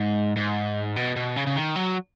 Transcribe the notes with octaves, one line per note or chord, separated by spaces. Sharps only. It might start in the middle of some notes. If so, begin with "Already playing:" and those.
Already playing: G#2
G#2
B2
B2
C#3
C#3
D#3
F#3